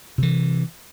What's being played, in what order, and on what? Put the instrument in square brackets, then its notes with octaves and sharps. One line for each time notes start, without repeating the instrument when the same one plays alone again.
[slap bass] C3 E3